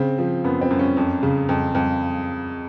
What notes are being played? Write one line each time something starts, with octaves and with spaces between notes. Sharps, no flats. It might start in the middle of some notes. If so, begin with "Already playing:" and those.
Already playing: C#3 C4
F3
F#2 B3
C4
F#2
C#4
F2
C#3
F2
F2